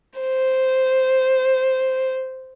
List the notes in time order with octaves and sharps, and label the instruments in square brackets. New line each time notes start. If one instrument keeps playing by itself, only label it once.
[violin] C5